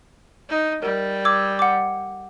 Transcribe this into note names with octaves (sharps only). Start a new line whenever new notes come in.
D#4
G3 A#4
D6 E6 G#6
F#5 D6